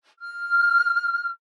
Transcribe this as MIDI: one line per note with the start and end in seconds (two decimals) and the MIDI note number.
0.20 1.29 89